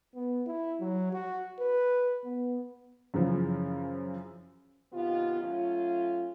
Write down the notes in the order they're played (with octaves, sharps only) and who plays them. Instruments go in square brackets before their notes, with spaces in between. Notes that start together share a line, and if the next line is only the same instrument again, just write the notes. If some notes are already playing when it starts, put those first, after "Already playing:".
[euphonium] B3
E4
F#3
F#4
B4
B3
[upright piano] F#2 C#3 E3 F3
[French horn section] C3 D#3 B3 F4
F#3 A3 C#4 F4